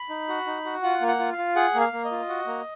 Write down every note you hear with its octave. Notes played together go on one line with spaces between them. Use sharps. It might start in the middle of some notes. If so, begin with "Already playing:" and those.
Already playing: B5
D#4
F#4
D#4
F#4
F4 F#5
A#3
F#5
F4
F5
F4
G#4 F#5
A#3
F5
A#3
D#5
F4
F#4
A#3